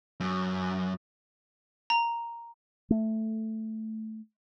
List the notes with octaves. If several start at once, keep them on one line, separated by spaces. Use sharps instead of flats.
F#2
A#5
A3